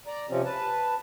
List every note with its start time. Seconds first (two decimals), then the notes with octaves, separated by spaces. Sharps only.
0.07 D5 A#5
0.29 C3 F3 C4 C#4
0.45 B4 A5